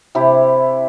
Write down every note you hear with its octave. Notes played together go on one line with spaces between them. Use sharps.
C3 E4 G4